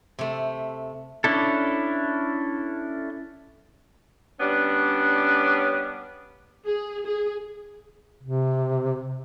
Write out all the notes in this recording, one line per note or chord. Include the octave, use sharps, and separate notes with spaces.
C3 A3
C#4 D4 E4 A4
G3 B3 C#4 D4
G#4
G#4
C3